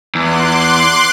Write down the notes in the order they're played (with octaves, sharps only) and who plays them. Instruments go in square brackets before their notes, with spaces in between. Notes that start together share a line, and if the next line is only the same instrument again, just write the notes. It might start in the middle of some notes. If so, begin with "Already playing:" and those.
[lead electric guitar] E2 [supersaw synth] C6 D6 F#6